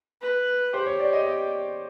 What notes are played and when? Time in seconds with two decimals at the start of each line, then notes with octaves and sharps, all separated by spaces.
0.22 B4
0.73 G4 C5
0.86 C#5
1.00 D5
1.13 D#5
1.26 D#5